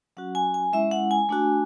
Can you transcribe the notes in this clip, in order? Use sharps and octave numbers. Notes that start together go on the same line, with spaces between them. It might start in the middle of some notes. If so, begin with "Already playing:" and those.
F#3 C#4 F#4 F#5
G#5
G#5
G#3 C#4 E4 E5
F#5
G#5
A3 D4 F#4